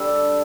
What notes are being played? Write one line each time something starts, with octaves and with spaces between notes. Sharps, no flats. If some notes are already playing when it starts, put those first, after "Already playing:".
Already playing: G3 D4 A4